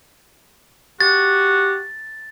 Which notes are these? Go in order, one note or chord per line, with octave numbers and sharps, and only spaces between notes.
F#4 G4 A6